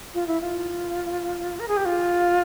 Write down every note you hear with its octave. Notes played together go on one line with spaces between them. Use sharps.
F4
E4
F4
A#4
G#4
G4
F4